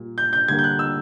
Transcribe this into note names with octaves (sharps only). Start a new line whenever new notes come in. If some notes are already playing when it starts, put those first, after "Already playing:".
Already playing: A#2 G3
G6
G6
D3 G3 A#3 G#6
G6
F#6
E6